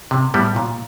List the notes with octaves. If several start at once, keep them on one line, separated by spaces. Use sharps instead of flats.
C3
A2 G3 B3
A#2